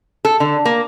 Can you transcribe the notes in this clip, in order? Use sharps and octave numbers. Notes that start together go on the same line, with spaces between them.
A4
D3
A#3